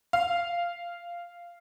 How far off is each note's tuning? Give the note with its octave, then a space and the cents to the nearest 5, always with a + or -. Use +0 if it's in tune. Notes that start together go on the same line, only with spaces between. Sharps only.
F5 -10